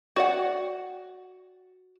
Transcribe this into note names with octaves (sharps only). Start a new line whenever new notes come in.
F#4 D5 F#5